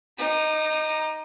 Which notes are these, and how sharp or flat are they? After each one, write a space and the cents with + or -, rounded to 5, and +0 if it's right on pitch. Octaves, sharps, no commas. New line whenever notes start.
D#4 +0 D6 +45